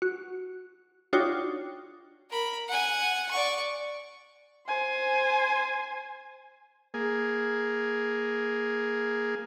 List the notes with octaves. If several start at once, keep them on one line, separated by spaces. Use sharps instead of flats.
F#4
D4 D#4 F4 F#4 C#5 G5
A#4 B5
F#5 G#5
D5 C#6
C5 G#5
A#3 G#4